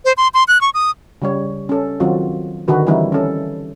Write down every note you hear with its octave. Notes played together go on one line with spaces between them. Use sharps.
C5
C6
C6
F#6
C#6
D#6
C#3 G3 C#5
C#4 A4
D#3 F#3 C4 F4 F#4
D3 D#3 F#4 B4
D3 E3 G3 C4 D#4 E4
C#4 A4